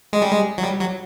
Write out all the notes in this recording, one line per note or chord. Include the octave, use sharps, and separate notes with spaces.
G#3
G3
G#3
F#3
G3
F#3